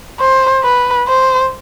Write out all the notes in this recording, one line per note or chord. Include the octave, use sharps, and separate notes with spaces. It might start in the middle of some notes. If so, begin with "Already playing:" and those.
C5
B4
C5